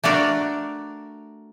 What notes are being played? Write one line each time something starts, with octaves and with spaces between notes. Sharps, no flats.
A3 D4 F#4 A#4 D5